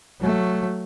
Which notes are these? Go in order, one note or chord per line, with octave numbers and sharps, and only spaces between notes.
F#3 A3